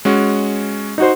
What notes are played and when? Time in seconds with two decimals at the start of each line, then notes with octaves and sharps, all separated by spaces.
0.05 G#3 C#4 F#4
0.98 D#4 F#4 C5